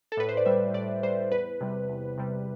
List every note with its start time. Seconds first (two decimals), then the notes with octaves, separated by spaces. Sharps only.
0.12 A4
0.17 A2 B4
0.29 C5
0.37 D5
0.46 G3 E5
0.74 A2 D5
1.03 G3 C5
1.31 E2 B4
1.61 C3 G3
1.89 E2
2.18 C3 G3